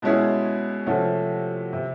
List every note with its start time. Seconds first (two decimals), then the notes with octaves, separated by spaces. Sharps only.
0.02 B2 G#3 C#4 E4 G#4
0.86 C3 F3 A3 C#4 F#4
1.73 C3